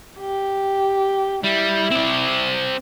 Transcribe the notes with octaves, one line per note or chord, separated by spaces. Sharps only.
G4
G3 E4
C4 D5